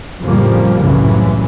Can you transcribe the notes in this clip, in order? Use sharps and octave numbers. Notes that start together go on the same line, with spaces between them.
F2 A2 C#3 F3 G3 A#3
C2 F#2 A2 C#3 E3